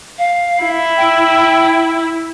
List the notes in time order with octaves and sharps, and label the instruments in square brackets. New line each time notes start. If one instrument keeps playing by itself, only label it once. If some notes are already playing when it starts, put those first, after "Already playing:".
[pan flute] F5
[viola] E4
[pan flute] G5